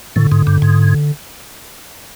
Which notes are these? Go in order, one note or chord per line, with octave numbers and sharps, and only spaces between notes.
A2 D3
G#2
G2
G#2